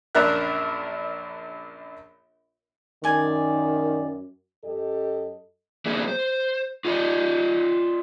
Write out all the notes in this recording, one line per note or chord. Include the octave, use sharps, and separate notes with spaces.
A#1 F#2 D4 A#4 E5 F#6
F#2 D#3 D5 G#5
F#2 G4 A4 D#5
F#3 A#3 C4 D4 E4 G#4
C5
F4 G#4 A4 D5 D#5